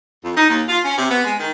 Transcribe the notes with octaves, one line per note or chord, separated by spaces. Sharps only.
F2
D#4
D#2
F4
C#4
C3
B3
G#3
D#3